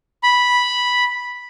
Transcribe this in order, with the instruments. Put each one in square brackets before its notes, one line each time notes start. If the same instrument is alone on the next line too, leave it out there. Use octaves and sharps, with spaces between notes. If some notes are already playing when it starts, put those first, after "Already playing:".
[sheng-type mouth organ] B5